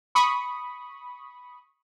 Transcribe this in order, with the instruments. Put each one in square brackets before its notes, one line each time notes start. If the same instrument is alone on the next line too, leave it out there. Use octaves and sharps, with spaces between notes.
[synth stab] B5 C#6 D#6